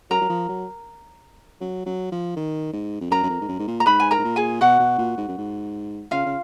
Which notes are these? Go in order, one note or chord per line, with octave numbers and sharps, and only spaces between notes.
F#3 A#4 A#5
F#3
F3
F#3
F#3
F#3
F3
D#3
G#2
F2
F#2 A#4 A#5
F#2
F2
G#2
F#2
G#2
A#2
A#5
G#2 B4 B5
G#5
A#4 A#5
G#2
A#2
G#4 G#5
B2 F#4 F#5
B2
A#2
G#2
F#2
G#2
C#3 F4 F5
C#3